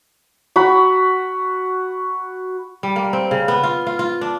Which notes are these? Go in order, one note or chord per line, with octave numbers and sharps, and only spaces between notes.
F#4 B5
G3
A#3
C4
C#3
B3
F4
F4
F4
D4